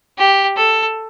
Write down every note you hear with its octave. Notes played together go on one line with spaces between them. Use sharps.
G4
A4